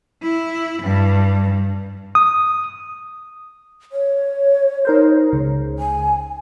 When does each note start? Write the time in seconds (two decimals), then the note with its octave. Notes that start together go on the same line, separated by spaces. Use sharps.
0.22 E4
0.82 G2
2.15 D#6
3.92 C#5
4.85 D#4 A#4 C5
5.32 C#2 C#3
5.79 G#5